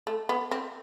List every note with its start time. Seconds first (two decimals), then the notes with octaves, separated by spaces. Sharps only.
0.07 A3
0.29 B3
0.51 C4